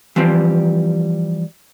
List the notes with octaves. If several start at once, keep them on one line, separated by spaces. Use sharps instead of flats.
E3 F3 G3 C4